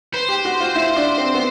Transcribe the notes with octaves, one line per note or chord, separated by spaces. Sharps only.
B4 C5
G4
F#4
F4
E4
D4
C4
B3